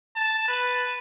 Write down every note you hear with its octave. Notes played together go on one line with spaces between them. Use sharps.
A5
B4